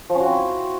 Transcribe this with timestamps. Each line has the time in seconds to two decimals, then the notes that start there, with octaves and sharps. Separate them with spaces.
0.10 F3
0.15 C#4
0.20 F#4
0.26 C4
0.31 E4